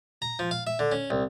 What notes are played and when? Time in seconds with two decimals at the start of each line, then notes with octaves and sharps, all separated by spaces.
0.22 A#5
0.39 F3
0.51 F5
0.67 E5
0.79 D3
0.92 C#4
1.10 C2